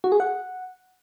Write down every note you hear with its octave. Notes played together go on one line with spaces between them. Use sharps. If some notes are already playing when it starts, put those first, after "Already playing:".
F#4
G#4
F#5